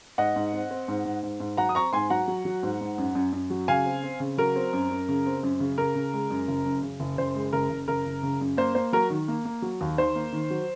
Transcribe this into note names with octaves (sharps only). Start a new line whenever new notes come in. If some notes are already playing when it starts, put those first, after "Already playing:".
G#2 D#5 F#5
G#2
C4
C4
G#2
G#2
G#2
G#2
F#3 F#5 A#5
D#6
C4 A#5 C#6
G#2 G#5 C6
F#3 F#5 A#5
F#3
F#3
G#2
G#2
F#2
F#2
F#2
F#3
C#3 F5 G#5
C4
C4
C#3
F#3 A#4
C4
F#2
F#2
C#3
C4
F#2
C#3
C#3 A#4
C#3
G#3
F#2
F#1
F#2
C#3
F#1
F#1 C5
G#3
F#1 A#4
F#1
F#1 A#4
F#1
C#3
F#2
A#3 C5
A#3 C5
F#3 A#4
D#3
A#3
A#3
F#3
D#2
D#3 C5
A#3
D#3
F#3